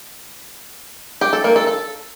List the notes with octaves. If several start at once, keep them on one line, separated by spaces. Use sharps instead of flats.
G4
A4
A#3
A4
A4